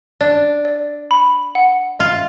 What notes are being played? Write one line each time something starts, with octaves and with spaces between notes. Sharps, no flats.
D4 D5
D5
B5
F#5
F4 D#5